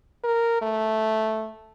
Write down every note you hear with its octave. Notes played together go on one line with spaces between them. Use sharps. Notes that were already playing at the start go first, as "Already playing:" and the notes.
A#4
A3